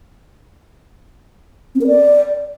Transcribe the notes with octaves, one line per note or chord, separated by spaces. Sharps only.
C4
A#4
D5